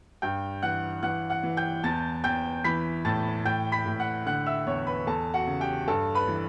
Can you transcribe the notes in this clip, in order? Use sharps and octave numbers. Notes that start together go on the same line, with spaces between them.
G2 G5 G6
E3 F#5 F#6
E3 F#5 F#6
F#5 F#6
E3
G5 G6
E2 A5 A6
E2 G5 G6
E3 B5 B6
A2 A5 A6
A2 G5 G6
B5 B6
A2
F#5 F#6
D3 F#5 F#6
E5 E6
E2 C#5 C#6
B4 B5
E2 A4 A5
F#4 F#5
C#3
G4 G5
G2 A4 A5
B4 B5
E3